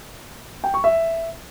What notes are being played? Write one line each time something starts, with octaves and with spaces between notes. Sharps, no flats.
G5
C#6
E5